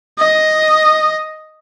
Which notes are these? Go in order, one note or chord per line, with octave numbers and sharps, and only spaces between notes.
D#5